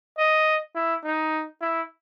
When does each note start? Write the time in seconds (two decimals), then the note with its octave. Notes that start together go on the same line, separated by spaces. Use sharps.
0.18 D#5
0.75 E4
1.04 D#4
1.61 E4